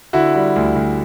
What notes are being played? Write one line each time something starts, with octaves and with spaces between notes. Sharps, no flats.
D3 E4 F#4
G3
D2
D2